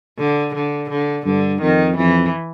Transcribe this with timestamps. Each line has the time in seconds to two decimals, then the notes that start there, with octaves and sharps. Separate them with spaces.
0.19 D3
0.55 D3
0.90 D3
1.26 G2 D3
1.62 F2 D#3
1.97 F2 E3